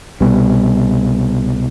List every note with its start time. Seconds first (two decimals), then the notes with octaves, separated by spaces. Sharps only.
0.20 C2 B2 G3